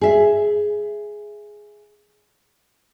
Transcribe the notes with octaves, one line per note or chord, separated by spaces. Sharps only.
G#4 E5